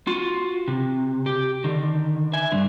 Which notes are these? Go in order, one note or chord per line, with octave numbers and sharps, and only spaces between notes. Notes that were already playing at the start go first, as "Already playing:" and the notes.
F4 F#4
C3
G4
D3 D#3
E5 G#5
G2 D3